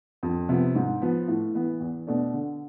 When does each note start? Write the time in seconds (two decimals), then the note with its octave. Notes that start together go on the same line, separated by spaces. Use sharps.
0.23 F2
0.49 C3 F3 B3
0.75 G#2
1.02 F3 B3
1.28 A2
1.55 E3 B3
1.80 E2
2.07 B2 A3 D4
2.34 D3